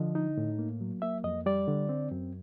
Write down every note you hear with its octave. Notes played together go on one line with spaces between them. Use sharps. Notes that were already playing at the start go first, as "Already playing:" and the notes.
Already playing: D3 F3 D#5
D#4
A2
A#3
F#3
A#3 E5
F2 D#5
G3 D5
D3
C4
F#2